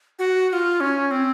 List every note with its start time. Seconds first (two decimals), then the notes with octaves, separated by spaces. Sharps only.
0.19 F#4
0.49 F#4
0.53 F4
0.80 C#4
1.11 C4